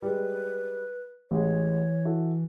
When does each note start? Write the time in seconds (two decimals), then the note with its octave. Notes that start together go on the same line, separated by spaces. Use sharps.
0.02 G3 G#3 B4
1.31 A1 E3 G#3 C#5
2.05 E4 F#4 A4